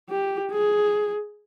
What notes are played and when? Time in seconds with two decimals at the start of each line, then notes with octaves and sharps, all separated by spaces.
0.10 G4
0.52 G#4